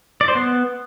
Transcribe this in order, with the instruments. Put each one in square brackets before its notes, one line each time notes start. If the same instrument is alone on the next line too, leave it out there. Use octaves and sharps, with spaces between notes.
[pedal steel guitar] D5
C5
B3